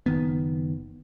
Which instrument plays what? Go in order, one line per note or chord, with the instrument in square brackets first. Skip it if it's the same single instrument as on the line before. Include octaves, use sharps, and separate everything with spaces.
[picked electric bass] F#1 D#3 B3